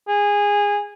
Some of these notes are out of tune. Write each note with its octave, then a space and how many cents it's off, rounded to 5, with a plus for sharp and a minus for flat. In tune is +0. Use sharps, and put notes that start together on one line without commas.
G#4 -20